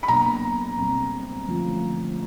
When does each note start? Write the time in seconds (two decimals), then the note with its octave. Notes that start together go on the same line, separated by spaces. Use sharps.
0.03 B5
0.08 B2 F#3 A#3 D4 A#5
0.78 B2 G3 C4
1.48 D3 F3 A3 C#4 F4